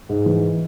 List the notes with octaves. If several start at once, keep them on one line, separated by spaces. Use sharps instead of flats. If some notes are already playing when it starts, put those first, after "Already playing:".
G#2
E3